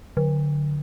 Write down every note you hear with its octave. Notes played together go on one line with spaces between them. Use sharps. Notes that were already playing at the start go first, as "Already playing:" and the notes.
D3